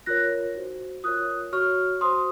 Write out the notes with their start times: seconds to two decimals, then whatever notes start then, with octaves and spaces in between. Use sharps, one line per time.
0.06 F4 A#4 C#5 F#6 A#6
0.55 D#4 F#4 C5
1.04 F4 A#4 C#5 D#6 F#6
1.53 F#4 C#5 C#6 F6
2.01 F#4 C5 C6 D#6